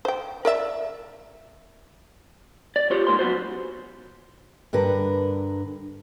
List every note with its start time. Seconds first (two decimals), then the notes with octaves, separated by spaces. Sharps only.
0.05 C5 G5
0.45 A#4 D5 E5
2.76 D5
2.91 F4 G4 C5 C#5
3.07 G#2 A#3 C6
3.19 F#2 B3 F#4 C5
4.73 G2 D3 A#4 B4